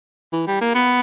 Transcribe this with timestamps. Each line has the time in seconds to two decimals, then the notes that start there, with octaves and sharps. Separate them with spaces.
0.33 E3
0.47 G3
0.61 A#3
0.75 B3